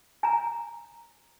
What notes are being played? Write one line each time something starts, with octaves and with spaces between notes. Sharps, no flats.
G#5 A#5